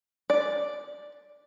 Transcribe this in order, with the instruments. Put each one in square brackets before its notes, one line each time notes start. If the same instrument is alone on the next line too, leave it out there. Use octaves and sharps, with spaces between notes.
[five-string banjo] D5